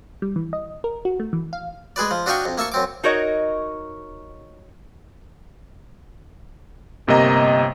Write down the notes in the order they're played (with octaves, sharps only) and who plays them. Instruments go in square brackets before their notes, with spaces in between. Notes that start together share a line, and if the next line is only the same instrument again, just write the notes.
[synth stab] G3
E3
D#5
A#4
F#4
A3
E3
F5
[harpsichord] G#3 G#4 B4 D5
F3
D4 F#4 D#5 F5 G5 C#6
F2
A#3 E5 A5 C#6
F#2 C4 D6
[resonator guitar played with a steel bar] D#4 F#4 A#4 C#5 D#5
[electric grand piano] G1 C3 A#3 D#5 A#5